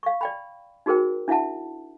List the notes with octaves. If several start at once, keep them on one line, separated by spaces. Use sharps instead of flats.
F5 C#6
D5 G5 B5
D#4 F#4 G#4 A#4 C5 G5
D4 E4 E5 F#5 A5